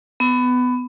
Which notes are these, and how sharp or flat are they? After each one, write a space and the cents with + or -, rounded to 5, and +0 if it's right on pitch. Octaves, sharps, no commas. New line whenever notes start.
B3 +20